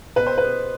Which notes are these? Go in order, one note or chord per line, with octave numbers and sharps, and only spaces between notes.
B2 B4
C5
B4
B3